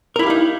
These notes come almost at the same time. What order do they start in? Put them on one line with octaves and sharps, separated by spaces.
A#4 E4 G4 F5 D#4